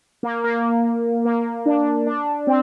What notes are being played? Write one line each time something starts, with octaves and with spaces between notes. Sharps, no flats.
A#3
A#3
A#3
D4
D4
C4